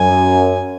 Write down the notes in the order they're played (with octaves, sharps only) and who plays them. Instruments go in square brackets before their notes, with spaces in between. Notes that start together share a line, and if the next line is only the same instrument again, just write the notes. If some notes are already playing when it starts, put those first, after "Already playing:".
Already playing: [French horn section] F#2 [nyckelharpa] G#5